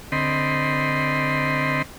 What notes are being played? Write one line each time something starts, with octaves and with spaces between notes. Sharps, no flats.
D3 C4 D#5 B5 C6